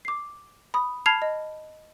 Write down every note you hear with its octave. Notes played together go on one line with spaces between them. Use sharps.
D6 C7
B5 D#6
A5 B5 F6 G#6 C7 F7
D#5